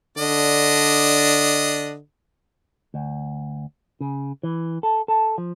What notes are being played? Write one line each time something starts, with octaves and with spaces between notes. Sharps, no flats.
D3 D4 D#5
D2
C#3
E3
A4
A4
F3